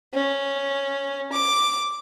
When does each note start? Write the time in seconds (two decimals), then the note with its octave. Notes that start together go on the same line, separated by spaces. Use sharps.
0.13 C#4
1.32 D6